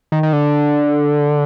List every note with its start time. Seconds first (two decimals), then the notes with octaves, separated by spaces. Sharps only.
0.12 D#3
0.23 D#3
0.33 D3